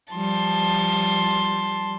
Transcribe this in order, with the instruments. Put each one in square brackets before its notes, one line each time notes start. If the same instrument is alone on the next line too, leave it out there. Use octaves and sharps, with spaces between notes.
[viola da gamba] F3 G3 [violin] A5 C6